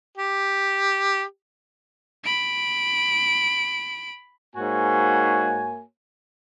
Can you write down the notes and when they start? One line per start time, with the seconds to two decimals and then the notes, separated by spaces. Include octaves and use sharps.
0.17 G4
2.24 B5 D7
4.56 G#2 A#3 F#4 C#5 G#5